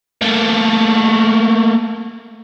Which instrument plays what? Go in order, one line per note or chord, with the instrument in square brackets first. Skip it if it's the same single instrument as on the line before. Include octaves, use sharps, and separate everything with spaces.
[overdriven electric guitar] A3 A#3